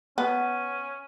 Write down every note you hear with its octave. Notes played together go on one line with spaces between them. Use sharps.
B3 C#4